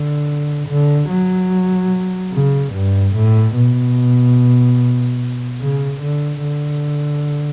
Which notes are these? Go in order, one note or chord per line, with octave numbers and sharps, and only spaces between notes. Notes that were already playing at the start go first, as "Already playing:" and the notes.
Already playing: D3
D3
F#3
C#3
G2
A2
B2
C#3
D3
D3